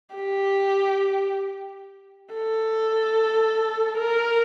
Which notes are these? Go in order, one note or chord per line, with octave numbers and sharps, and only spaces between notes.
G4
A4
A#4